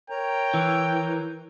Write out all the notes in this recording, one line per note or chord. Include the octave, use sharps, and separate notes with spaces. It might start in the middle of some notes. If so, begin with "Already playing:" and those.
A#4 C#5 G5 A#5
E3